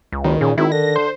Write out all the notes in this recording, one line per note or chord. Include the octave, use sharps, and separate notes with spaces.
C#2
F#1 D#3
A#2 C#3
G#1 D#3 E4
D3 A#6
C5